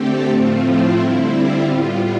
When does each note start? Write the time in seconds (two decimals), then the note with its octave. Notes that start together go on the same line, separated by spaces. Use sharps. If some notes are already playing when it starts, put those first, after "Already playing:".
Already playing: D3 A3 C4 G4 A4
0.28 A2 F3 A3 C4 F4
0.62 E4
0.95 D3 G3 C4 E4
1.29 F4
1.63 A2 G3 B3